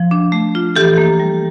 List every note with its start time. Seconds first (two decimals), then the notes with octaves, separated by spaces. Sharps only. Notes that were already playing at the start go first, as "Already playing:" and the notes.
Already playing: F3
0.11 D4
0.32 A3
0.55 F4
0.76 E3 G4 A4
0.98 A#3
1.20 G3